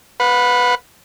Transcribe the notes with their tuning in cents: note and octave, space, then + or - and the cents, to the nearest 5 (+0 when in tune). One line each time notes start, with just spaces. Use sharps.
B4 +0 F#5 -45